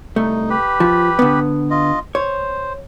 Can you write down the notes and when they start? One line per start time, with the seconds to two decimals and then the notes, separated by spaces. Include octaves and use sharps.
0.16 C2 A3 D#4
0.50 G4 B4
0.80 F3
1.19 D3 B3
1.70 F4 D#5
2.15 C5 C#5